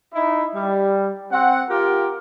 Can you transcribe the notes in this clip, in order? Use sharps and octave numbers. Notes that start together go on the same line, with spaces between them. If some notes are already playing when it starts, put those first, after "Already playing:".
D#4 E4
G3
C4 F#5
F4 G4 A#4